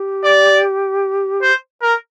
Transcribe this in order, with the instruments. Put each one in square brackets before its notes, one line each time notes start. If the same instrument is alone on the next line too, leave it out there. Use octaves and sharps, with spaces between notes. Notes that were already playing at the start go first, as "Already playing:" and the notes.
Already playing: [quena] G4
[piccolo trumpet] D5
C5
A#4